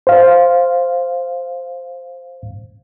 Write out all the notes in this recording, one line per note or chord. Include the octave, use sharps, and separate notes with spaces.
C5 F5